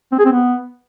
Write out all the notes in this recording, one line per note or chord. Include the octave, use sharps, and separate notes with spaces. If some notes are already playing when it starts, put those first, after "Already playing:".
C4
G#4
C4
B3